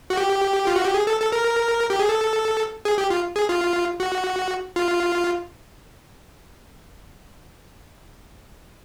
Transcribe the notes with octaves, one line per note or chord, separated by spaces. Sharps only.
F#4
G4
F4
F#4
G4
G#4
A4
A4
A#4
G4
G#4
A4
G#4
G4
F4
G#4
F4
F#4
F4